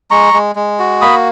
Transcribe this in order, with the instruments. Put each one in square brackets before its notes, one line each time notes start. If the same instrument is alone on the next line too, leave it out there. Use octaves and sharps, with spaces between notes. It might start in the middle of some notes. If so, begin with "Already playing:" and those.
[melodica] G#3 A#5 C#6
G#3
G#3
F#4
A#3 B5 D#6